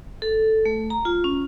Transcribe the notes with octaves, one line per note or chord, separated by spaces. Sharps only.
A4
A3
A#5
F4
C#4